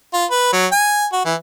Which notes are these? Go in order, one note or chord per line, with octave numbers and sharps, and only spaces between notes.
F4
B4
F#3
G#5
F#4
E3